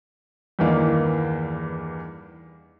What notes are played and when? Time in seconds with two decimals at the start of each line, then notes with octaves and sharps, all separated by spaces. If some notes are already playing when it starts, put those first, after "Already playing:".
0.59 E2 G2 D#3 E3 A#3